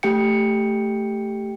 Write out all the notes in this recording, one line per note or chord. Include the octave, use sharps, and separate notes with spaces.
A3 G4 G5 C#7